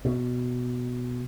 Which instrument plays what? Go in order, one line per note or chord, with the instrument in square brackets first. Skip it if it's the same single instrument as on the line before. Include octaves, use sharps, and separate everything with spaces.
[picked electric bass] B2